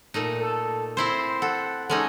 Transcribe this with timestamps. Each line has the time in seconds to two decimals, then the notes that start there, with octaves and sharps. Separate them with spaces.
0.14 A#2 A3 D#4
0.40 A4
0.97 C4 E4 C5 C6
1.42 A4 F#5
1.90 G#3 C#4 D#4 A4